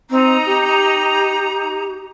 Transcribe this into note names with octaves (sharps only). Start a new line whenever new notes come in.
C4 D#4 A#5
G4